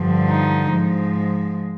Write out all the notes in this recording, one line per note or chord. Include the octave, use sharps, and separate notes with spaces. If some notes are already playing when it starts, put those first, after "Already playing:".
Already playing: G2 D3 F3
D#4
G#2 F3 G#3